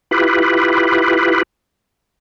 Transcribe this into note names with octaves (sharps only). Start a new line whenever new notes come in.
E4 F4 G4 B4